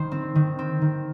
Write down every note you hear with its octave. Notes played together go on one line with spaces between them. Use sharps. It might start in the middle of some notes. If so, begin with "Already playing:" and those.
Already playing: D#3 C5
C4
D#3
C4
D#3